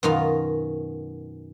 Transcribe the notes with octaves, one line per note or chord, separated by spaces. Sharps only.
F#2 B2 D#3 F4 D#5 A#5